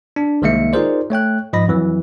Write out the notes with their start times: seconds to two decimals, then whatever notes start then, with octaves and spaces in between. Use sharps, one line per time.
0.16 D4
0.42 C2 D#3 G#3 A#3 E5 C#7
0.73 D#4 F4 G#4 A#4 C5 D5
1.10 A3 C#5 G5 F#6
1.53 G#2 F3 D#5 B5 A#6
1.68 F2 E3 F#3